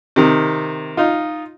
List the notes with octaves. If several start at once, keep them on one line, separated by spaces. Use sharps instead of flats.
C3 D#3
D#4 F4